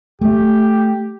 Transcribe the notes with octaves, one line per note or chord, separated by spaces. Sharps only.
A3 G4